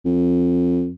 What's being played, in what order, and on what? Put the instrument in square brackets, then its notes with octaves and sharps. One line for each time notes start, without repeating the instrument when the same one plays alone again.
[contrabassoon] F2